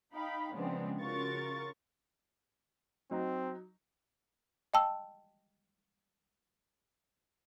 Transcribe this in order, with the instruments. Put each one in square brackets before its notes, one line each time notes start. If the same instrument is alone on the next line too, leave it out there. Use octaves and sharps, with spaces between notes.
[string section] D#4 F5 G5 B5
C#3 F3 G#3 B3 C4 D4
C#3 F4 F#4 A#4 C#6 A6
[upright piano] F#3 D#4 [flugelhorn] C4
[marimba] D#5 G5 A5 E6